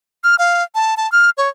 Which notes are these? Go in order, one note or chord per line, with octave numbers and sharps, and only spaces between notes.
F6
F5
A5
A5
F6
C#5